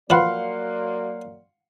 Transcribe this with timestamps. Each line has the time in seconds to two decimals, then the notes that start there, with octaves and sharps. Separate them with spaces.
0.10 F3 F#3 A#3 B4 D5 F5 F#5 C6